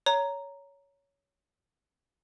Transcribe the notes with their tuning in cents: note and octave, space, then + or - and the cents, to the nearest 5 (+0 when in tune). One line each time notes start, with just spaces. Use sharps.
C#5 +15 A#5 +0